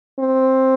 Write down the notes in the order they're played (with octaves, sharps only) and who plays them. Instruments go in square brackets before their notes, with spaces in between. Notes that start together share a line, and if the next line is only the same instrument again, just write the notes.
[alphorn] C4